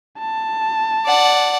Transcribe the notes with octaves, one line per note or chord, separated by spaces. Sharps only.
A5
D5 F#5